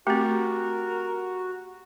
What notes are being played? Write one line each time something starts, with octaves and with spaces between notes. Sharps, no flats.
A3 C4 F#4 G4 A#4